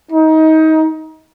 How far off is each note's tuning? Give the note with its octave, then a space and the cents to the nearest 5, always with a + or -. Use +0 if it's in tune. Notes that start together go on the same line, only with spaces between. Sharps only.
D#4 +25